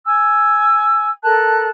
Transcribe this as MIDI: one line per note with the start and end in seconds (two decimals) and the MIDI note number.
0.06 1.10 80
0.06 1.10 88
1.24 1.67 69
1.24 1.67 70
1.24 1.67 81
1.24 1.67 90